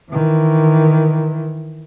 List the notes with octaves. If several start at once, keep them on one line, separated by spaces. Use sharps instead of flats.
D#3 E3